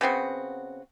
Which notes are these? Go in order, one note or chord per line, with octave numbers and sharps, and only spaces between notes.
C#3 B3 C4 F#4